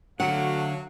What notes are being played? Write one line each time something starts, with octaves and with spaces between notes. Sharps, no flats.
D3 F#3 A3 F#4 F5 F#5